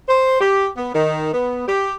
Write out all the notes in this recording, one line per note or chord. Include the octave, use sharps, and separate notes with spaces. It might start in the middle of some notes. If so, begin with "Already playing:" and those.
C5
G4
B3
D#3
B3
G4